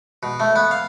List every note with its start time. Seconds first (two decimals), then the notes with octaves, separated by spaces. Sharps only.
0.23 B2
0.40 A3
0.56 B3
0.71 F5